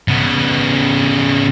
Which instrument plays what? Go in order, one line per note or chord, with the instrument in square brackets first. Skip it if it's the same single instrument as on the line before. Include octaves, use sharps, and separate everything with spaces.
[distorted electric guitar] C#3 B3